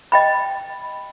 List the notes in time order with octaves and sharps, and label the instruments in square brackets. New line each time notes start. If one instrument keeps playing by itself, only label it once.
[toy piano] D#5 G5 B5